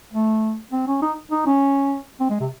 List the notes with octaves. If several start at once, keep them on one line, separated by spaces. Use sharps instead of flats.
A3
C4
C#4
D#4
D#4
C#4
C4
G#3
C3